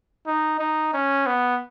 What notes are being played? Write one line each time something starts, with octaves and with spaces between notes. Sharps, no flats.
D#4
D#4
C#4
B3